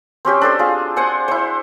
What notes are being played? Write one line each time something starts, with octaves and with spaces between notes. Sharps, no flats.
C4 C#4 G4 C5
D4 A4 C5
F4 G#4
C5 F#5 G#5
E4 C5